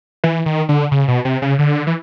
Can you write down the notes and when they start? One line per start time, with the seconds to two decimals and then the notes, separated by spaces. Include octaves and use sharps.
0.24 E3
0.46 D#3
0.69 D3
0.91 C#3
1.08 B2
1.25 C3
1.42 C#3
1.59 D3
1.87 E3